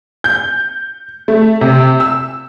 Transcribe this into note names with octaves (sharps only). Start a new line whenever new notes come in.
G6
A3
C3
E6